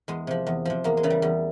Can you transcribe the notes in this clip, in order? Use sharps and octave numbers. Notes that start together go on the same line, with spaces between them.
E2 G#3
C3 F3
E2
C3 F3
E2 A#3
G#3
C#3 E3
G3
E2 G3